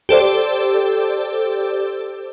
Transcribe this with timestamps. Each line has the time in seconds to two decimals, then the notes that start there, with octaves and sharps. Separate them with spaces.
0.09 G4 A4 C5 D5